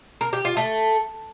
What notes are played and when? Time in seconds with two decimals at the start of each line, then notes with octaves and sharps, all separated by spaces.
0.21 A#4
0.33 G4
0.45 F4
0.57 A3